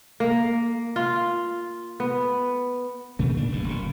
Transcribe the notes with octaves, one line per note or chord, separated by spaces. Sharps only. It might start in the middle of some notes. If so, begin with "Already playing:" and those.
A#3
F4
B3
A#2 A3
D4
F#1 G2
F#1 A#2